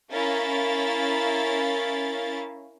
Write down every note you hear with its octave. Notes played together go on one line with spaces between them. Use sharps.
C#4 E4 A#4 F5 A6